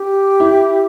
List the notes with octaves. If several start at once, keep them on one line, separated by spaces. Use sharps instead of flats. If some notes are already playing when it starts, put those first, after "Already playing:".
Already playing: G4
E4